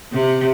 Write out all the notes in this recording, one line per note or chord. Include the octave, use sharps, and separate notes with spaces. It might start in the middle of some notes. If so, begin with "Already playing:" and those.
C3